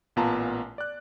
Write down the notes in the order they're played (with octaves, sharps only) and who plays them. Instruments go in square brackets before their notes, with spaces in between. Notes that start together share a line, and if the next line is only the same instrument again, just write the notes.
[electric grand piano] A1 A#2 B3 F4 A5 A#5
D5 F#6